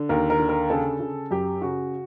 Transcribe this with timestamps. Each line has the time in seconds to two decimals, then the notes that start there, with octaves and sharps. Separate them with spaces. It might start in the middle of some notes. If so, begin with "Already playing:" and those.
Already playing: D3
0.09 D#2 A#4
0.30 A#4
0.39 D3
0.49 A#4
0.70 C#3 A4
1.00 C#3
1.31 F#2 G4
1.62 C#3 F#4